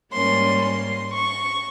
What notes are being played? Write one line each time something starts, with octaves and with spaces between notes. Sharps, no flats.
G#2 G3 A#3 C#4 C6
C6
C#6